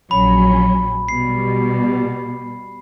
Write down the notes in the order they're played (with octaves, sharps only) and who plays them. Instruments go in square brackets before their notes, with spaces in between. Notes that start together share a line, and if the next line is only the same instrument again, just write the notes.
[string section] A#1 F#3 C#4 [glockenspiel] B5
[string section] B2 G3 [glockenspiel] C7